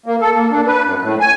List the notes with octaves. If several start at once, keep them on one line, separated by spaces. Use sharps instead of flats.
A#3
A4
A#3
D4
B4
F#2
A2
G#5